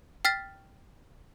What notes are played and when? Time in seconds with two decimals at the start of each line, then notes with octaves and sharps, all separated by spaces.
0.25 G5 F6 A6 B6